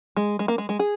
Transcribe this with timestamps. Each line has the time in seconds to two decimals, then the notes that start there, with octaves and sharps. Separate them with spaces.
0.17 G#3
0.39 G#3
0.48 A#3
0.58 G#3
0.69 G#3
0.79 G#4